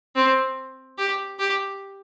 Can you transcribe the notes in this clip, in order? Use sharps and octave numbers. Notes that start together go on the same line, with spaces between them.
C4
G4
G4